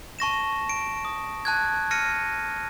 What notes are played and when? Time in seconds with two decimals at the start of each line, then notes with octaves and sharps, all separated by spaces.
0.19 A5 C#6 A#6 E7
0.69 D7
1.05 D#6
1.45 A5 F#6 G#6
1.91 F6 A#6 C#7 D#7